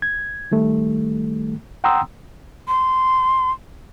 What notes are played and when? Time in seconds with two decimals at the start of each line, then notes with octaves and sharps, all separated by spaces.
0.02 G#6
0.52 D#3 G3 A3
1.84 F#5 G5 A#5 C6 D#6 E6
2.68 C6